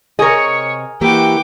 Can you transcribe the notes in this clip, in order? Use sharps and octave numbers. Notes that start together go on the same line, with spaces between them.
C3 G#4 A#4 C#5 D#5 C#6
E3 A#3 F#4 G4 B4 G5 D6